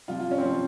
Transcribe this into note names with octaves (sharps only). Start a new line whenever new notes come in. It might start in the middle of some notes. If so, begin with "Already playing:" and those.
C3 F3 F4
F4
C#4
C4
C3 F3 C#4